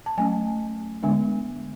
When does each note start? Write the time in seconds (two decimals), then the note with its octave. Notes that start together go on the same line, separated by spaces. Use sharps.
0.06 A5
0.17 F#3 A3 C#4 G#5
1.03 D3 G#3 B3 D4 G#5